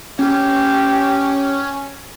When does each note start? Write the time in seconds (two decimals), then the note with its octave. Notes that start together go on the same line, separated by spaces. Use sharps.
0.19 C#4 G4